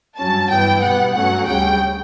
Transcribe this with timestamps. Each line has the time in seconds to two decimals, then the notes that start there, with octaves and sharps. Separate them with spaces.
0.17 G2 F#3 C#4 A5
0.50 G2 E3 B3 G5
0.82 B2 G3 B3 F#5
1.14 G2 F#3 A3 C#4 F#5
1.47 D2 C#3 G3 C#4 G5